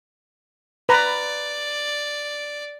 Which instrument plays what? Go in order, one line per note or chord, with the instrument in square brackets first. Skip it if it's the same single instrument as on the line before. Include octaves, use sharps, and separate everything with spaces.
[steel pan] B4 A#5 [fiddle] D5